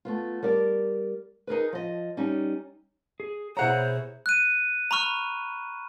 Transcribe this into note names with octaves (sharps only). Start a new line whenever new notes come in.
A3 B3 F4
G3 A#4 D5
D#4 G#4 A#4 B4
F3 D#5
G3 C#4 D#4
G#4
B2 E4 G#4 C5 C#5 F#5 A#5
F#6 D#7
A#5 B5 C#6 F6